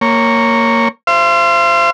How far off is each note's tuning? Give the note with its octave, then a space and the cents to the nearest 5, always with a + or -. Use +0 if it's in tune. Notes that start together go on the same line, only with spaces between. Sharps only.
A#3 -10 C#5 +0
C5 +0 F5 -45